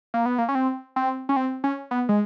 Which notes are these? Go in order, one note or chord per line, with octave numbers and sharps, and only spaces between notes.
A#3
B3
A#3
C#4
C4
C4
C#4
C4
C#4
B3
G#3